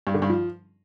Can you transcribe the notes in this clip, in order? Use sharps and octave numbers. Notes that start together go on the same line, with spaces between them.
G2
D3
G2
F3